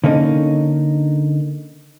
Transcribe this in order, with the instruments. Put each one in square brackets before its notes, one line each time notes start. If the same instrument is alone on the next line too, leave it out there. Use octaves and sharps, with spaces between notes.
[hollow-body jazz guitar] D3 A#3 C#4 D#4